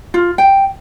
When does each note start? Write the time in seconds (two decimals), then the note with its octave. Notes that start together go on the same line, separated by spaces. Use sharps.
0.14 F4
0.38 G5